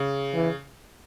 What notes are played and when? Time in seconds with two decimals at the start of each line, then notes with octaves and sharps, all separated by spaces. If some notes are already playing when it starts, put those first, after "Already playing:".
Already playing: C#3
0.35 E3